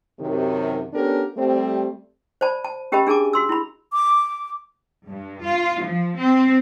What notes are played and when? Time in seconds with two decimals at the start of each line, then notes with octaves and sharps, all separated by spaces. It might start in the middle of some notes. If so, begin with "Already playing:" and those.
0.20 F#2 C3 D#3
0.94 B3 C#4 D4 G4 A4 A#4
1.37 G3 A3 C4
2.41 C5 D5 A5 B5
2.64 A5
2.92 C#4 G4 A#4 D#5 A5 B5
3.07 D4 G#4 A#4 G#5 A5 D6
3.33 F#4 C6 E6
3.49 E4 B5
3.93 D6
5.08 G2
5.43 F4
5.84 F3
6.18 C4